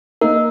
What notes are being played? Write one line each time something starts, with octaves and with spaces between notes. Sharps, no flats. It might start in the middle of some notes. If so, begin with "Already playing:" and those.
A#3 D#4 A#4